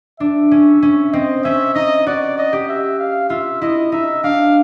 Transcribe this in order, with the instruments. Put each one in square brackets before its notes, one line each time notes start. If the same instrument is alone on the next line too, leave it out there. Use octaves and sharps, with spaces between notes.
[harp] D4 [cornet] E5
[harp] C#4
C#4
[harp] C4 [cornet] D#5
[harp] C#4 [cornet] E5
[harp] D#4 [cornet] D#5
[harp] F#4 [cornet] D5
[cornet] D#5
[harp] G4
[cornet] E5
F5
[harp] F4 [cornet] E5
[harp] E4 [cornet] D#5
[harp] D#4 [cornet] E5
[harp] D4 [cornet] F5